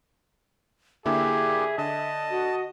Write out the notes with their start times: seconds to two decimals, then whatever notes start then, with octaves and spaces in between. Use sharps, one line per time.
1.06 D3 A#3 E4 G4 G#4 E5
1.78 D3 D#5 A5
2.30 F#4